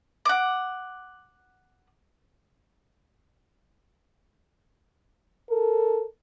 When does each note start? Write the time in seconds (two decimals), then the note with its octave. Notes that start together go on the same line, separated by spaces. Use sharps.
0.25 F#5 D6
5.50 A4 A#4